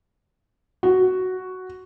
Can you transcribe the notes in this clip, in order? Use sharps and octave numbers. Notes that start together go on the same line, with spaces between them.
F#4